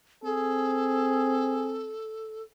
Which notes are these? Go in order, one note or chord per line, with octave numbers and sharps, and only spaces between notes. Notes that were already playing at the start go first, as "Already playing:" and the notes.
C4 G#4 A4